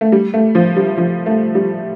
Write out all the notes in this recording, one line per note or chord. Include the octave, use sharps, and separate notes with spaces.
A3
G3
A3
F3
G3
F3
A3
G3